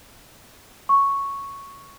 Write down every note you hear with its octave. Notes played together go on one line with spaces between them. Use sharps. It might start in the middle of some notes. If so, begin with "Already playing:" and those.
C#6